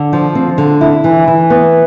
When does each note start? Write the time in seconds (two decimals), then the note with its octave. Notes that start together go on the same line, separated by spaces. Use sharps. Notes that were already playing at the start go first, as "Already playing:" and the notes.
Already playing: D3
0.13 F3
0.35 C4
0.58 D3
0.81 E4
1.04 E3
1.28 E3
1.50 B3